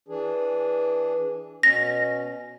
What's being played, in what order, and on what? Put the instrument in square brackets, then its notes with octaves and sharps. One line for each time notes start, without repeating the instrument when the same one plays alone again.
[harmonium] E3 D4 G#4
[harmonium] B2 C#4 [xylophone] A#6